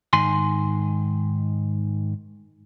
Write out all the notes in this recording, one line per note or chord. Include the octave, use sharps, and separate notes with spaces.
G#2 D#3 G#5 C6